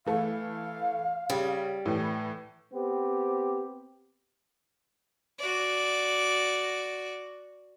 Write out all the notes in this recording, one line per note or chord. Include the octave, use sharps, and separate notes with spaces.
E3 A3 F5
C#3 G3
A2 E3
B3 C4 G4
F#4 D5